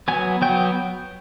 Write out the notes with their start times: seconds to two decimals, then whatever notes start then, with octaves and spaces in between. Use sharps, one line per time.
0.08 F#3 B3 G#5
0.42 F#3 B3 G5